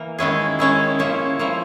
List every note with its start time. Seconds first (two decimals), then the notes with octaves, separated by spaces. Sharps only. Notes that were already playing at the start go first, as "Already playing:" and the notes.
Already playing: E3 A#3
0.18 D#3 G#3 C#4 E4 G#4
0.59 D#3 G#3 C#4 E4 G#4
0.99 F3 A#3 C#4 E4
1.39 F3 A#3 C#4 E4